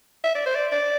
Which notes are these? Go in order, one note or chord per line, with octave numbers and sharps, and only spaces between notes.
E5
D5
C5
D5
D5